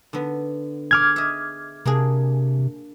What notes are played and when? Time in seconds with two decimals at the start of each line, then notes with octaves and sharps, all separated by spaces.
0.13 D3 B3
0.91 G#4 D6 F6 G#6
1.16 D#5 E5
1.85 C3 A#3 D4 G#4